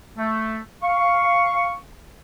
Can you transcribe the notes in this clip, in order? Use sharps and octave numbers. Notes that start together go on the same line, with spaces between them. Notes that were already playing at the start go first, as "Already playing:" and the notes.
A3
F5 C#6